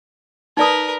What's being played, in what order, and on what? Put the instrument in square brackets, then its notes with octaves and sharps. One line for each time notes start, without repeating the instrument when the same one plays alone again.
[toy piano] D#4 D5 D#6 [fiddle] A#4 B4